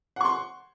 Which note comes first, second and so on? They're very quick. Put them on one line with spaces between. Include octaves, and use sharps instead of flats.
F#5 C#6 C6